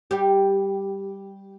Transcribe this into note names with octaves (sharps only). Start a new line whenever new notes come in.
G3 G4